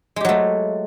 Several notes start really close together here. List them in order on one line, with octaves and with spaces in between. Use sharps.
G#3 G4 F#3 A3